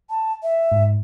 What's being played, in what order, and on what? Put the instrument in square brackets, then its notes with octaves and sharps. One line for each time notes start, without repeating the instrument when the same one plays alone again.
[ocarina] A5
E5
[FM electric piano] G#2